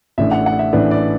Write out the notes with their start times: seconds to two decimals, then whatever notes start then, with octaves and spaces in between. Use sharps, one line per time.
0.18 A1 A2 E3 D4 E5
0.31 F#5
0.46 F#5
0.59 E5
0.73 A1 A2 E3 D4 B4
0.91 D5